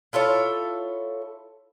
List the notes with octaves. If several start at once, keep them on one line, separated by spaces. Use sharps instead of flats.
E4 F4 A4 C#5